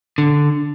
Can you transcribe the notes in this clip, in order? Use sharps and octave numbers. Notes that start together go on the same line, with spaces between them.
D3